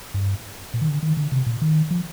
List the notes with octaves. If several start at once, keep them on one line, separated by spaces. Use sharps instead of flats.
G2
A#2
D#3
D3
D#3
D3
C3
A#2
D#3
F3